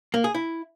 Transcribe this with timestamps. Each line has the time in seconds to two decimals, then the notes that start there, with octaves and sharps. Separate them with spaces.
0.14 A#3
0.24 G#4
0.34 E4